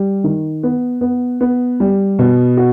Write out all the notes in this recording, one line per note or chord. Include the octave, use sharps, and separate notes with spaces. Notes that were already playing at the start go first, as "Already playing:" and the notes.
Already playing: G3
D#3
B3
B3
B3
G3
B2
F#4